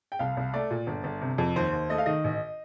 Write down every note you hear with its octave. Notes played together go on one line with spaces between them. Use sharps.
G5
C2 F5
C2
A3 D5
A#2
G1
G1
C3
F2
D#2 C5
D#2
A3 D#5
F5
D#3 D#5
A1